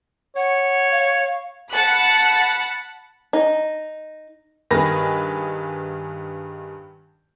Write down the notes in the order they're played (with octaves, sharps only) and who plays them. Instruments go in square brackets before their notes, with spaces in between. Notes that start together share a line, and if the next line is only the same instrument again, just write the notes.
[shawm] C#5 [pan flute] F#5
[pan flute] F5
[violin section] F#5 A5 B5 F#6
[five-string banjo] D#4
[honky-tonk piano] G2 D#3 G#4 B4 A#6